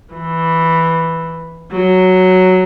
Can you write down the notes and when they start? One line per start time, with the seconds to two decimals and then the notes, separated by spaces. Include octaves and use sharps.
0.14 E3
1.72 F#3